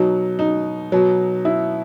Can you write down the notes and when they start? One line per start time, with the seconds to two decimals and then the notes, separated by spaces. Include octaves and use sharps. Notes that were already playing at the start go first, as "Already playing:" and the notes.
Already playing: B2 F#3 D#4
0.39 D#4
0.92 B2 F#3
1.45 E4